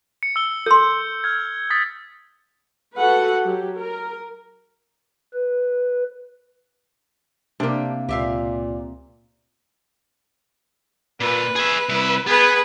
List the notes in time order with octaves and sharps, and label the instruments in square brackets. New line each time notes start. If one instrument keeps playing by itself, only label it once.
[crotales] C#7
E6 G7
[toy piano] A4 C6 [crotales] G6
[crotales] F6 G#6
D#6 A6 B6
[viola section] F#4 A4 B4 F#5
F#3 G4
A#4
[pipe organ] B4
[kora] C3 A#3 [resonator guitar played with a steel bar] D4 G4
[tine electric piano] C#2 [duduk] A#2 [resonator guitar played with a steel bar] G4 E5 F5
[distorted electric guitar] A#2 [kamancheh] B4
[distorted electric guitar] G#4 E5
C2 E4
[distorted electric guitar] B3 [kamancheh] G#4 B4